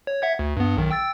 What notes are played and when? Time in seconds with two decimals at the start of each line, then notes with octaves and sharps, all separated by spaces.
0.07 C#5
0.22 E5 F#5 G#6
0.39 D2
0.57 G2 B3
0.77 B1 D#3
0.91 G5 E6 A6